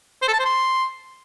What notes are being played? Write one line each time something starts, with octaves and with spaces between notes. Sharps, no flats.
C5
A4
A5
C5
C6